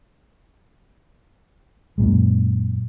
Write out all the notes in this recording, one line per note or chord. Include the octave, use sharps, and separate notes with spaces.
F#2 A#2 G#3